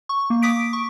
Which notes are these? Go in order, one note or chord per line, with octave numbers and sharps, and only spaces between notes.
C#6
A#3
D6 D#6 B6 D7
C#6